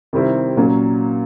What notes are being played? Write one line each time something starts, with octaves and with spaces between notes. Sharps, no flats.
C3 D#3 G3 C4 E4
A#2 F#3 A#3 C#4